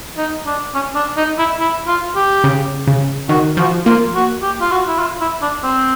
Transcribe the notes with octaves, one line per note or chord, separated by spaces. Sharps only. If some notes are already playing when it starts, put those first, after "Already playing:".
D#4
D4
C#4
D4
D#4
E4
E4
F4
G4
C#3
C#3
D#3 F#4
F3 F#4
A#3 F4
F#4
G4
F4
F#4
E4
F4
E4
D4
C4